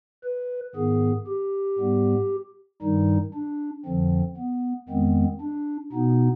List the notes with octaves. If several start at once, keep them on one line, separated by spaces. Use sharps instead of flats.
B4
G#2 D#3 B3 G#4
G4
G#2 G3 B3
G2 D#3 G3 D#4
D4
F2 D3 F3 C4
B3
F2 D#3 G#3 B3 C4
D4
B2 B3 D#4